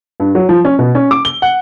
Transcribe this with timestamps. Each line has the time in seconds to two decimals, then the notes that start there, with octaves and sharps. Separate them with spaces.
0.20 G2
0.35 F#3
0.49 F3
0.65 C#4
0.79 B2
0.95 C#4
1.11 D6
1.25 G7
1.42 F#5